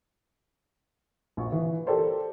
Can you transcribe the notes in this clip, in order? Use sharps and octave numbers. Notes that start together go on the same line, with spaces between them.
A#1 C#6
E3
G4 A4 A#4 C5 D5